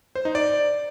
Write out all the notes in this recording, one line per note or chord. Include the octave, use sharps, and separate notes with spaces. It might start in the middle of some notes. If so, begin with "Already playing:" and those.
C5
D#4
D5